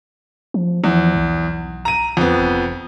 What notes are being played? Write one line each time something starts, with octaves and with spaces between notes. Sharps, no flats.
F3
E2 F3
B1
A#5 D#7
F2 B3
F1